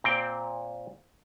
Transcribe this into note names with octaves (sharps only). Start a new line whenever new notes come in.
A#2 C4 G5